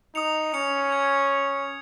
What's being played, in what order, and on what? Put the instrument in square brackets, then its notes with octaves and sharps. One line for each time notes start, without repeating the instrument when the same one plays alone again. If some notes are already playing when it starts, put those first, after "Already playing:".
[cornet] D#4 [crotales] D#6 C#7 F7
[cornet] C#4 [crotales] D#6 C#7 F7
[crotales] G#6 F7